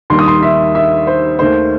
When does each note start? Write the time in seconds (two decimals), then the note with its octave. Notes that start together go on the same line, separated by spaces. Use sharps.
0.10 D#2 D#3 G3 C6
0.19 D#6
0.28 C6
0.42 E5
0.75 E5
1.07 C5
1.39 D#2 D#3 A3 C5